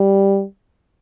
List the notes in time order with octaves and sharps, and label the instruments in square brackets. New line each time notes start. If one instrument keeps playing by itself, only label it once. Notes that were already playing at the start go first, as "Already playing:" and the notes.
Already playing: [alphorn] G3